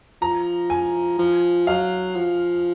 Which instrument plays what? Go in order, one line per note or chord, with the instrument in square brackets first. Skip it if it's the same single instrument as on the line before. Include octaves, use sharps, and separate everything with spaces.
[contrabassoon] F3 [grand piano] A#5
[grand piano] G#5
[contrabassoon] F3
[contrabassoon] F#3 [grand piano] F5
[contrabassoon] F3